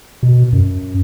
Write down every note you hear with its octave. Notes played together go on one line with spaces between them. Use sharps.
B2
F#2